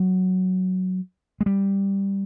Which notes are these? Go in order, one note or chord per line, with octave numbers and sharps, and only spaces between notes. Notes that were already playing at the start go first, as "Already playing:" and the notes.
Already playing: F#3
G#3
G3